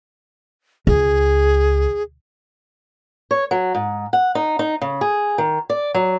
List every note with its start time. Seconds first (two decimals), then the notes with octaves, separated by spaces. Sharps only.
0.87 C#2 G#4
3.31 C#5
3.51 F#3
3.75 G#2
4.13 F#5
4.35 D#4
4.59 D#4
4.81 C#3
5.01 G#4
5.38 D#3
5.70 D5
5.94 F#3